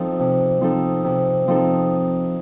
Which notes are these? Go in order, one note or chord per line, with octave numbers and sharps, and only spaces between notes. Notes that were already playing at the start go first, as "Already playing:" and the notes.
Already playing: F3 C4 D#4 A4
C3
F3 C4 D#4 A4
C3
F3 C4 D#4 A4